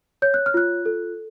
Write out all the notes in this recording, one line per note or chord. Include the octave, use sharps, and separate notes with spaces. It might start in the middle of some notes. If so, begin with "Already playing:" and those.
C#5 G6
F#6
F6
F4 F#6
A4